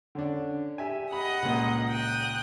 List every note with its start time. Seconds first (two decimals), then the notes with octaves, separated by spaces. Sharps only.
0.15 D3 C#4 D4
0.78 G4 E5 G#5
1.12 G4 D#5 F#5 B5 D#6
1.43 C#2 A#2
1.91 G5 D#6 F#6